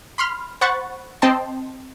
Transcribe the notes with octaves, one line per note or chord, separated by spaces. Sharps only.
B5 C6 F6
C5 F#5 B5 C#6 F#6 A6
C4 D#5 G5 A5 C6